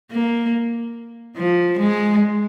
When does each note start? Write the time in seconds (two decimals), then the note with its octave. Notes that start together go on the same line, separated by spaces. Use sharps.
0.12 A#3
1.37 F3
1.79 G#3